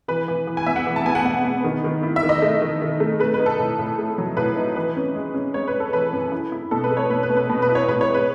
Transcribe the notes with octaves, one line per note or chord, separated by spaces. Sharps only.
E3 B4
E3
E3
G#5
B3 E5
F#5
E3
A5
B3 G#5
F#5
B3 F#5
B3
D#3
D#3
E4
E5
D#3
D#5
A3
D#3
D#3
A3
A3 B4
B4
D#4
A4
A2
A2
A3
F#3
A2 B4
D#4
E3 B4
C#4
G#3
C#4
G#3 C#5
B4
G#3
A4
E3 B4
F#2
E4
E4
B2 A4
B4
A3
C#5
B2 B4
B4
B2
B4
B2
B4
E4
C#5
A2 B4
C#5
G#3
B4